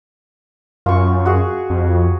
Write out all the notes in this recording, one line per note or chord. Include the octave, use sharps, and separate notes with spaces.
F#2 F4 C#6
F#4 G#4
F2